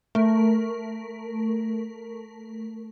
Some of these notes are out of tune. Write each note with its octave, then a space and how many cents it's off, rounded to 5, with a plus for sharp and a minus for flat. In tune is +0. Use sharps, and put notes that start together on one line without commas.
A3 +5 A#4 +0